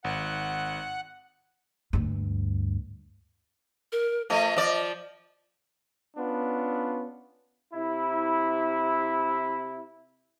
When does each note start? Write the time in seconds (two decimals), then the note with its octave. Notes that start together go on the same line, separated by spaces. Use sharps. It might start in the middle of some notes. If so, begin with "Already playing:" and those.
0.04 G#1 F#5
1.93 D2 G2
3.92 A#4
4.30 F3 A3 D#5
4.57 F3 D5
6.16 B3 C#4 D4 F4
7.73 C3 E4